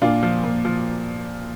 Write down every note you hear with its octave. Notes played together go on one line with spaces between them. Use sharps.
A#2 D4 F4
F3
A#2
F3